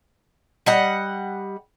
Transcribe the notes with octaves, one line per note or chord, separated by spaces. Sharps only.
G3 D#5 F#5